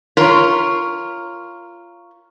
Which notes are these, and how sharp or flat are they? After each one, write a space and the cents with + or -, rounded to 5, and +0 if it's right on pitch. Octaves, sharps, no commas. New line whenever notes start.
F4 -15 A#4 +0 C#5 +0